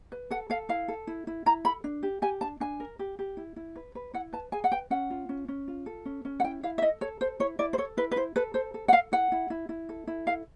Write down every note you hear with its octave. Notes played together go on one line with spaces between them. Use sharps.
B4
A4 F#5
A4 F5
E4 F5
A4
E4
E4
E4 A#5
A4 B5
D4
G4
G4 G#5
D4 A5
D4 G#5
A#4
G4
G4
E4
E4
B4
B4
E4 F#5
B4 A5
G#4 G#5
F#5
B4 G5
C#4 F#5
F4
C#4
C#4
F4
A4
C#4
C#4
F#5
E4 G5
E4 F5
E5
A4 D#5
A4 C#5
A4 C5
E4 C#5
E4 D5
C5
A4 C#5
E4 B4
B4
E4 C5
A4 B4
A4 C5
A4
F#5
A4 F5
E4 F#5
E4
E4
E4
A4
E4
A4 F5